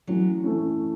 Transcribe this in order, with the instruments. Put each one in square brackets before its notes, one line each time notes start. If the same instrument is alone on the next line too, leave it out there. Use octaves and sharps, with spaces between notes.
[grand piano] E3 A3 C#4 [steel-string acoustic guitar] F#3
[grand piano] E3 A3 C#4